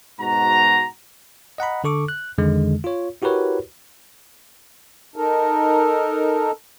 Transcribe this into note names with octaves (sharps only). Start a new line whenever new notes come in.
G#2 B2 F#4 A#5
D#5 F#5 A#5 B5
D3 A4 C#6 D6
F#6
F2 D3 D#3 G#3
F4 C#5
E4 F#4 G4 A#4 B4 C#5
D#4 A4 A#4